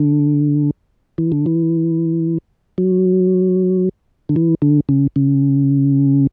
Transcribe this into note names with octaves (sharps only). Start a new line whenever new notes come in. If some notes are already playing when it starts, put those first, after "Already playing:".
Already playing: D3
E3
D3
E3
F#3
D3
E3
D3
C#3
C#3